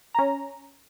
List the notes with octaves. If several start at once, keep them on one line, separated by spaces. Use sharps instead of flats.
C#4 A#5